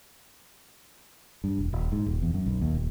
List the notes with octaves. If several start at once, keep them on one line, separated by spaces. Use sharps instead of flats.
G2
E1
D#1
G#2
D#1
E2
F#2
B1
D#2
D#1